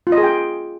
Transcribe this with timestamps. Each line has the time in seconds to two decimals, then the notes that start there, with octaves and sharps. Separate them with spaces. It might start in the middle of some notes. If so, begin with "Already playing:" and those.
0.07 F4
0.12 D#5
0.18 G#4
0.23 G5